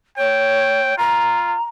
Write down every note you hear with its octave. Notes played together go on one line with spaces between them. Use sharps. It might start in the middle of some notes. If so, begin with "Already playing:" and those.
C#5 G5
F4 A#5